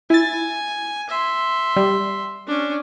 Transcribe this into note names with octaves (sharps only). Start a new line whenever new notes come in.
E4 G#5 A6
E5 C6
G3
C#4 D4